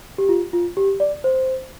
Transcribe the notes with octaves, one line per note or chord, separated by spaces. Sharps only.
G4
F4
F4
G4
D5
C5